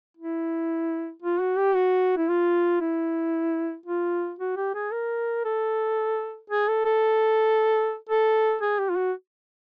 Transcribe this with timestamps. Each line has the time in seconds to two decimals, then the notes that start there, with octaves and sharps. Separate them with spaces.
0.17 E4
1.22 F4
1.40 F#4
1.57 G4
1.75 F#4
2.17 E4
2.29 F4
2.81 E4
3.86 F4
4.39 F#4
4.57 G4
4.74 G#4
4.92 A#4
5.45 A4
6.50 G#4
6.68 A4
6.85 A4
8.09 A4
8.62 G#4
8.79 G4
8.90 F4
8.96 F#4